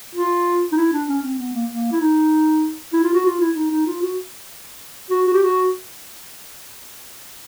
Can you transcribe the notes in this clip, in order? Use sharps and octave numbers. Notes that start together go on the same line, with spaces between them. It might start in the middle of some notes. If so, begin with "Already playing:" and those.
F4
D#4
E4
D4
C#4
C4
B3
A#3
A#3
E4
D#4
E4
F4
F#4
F4
E4
D#4
D#4
F4
F#4
F#4
F#4
G4
F#4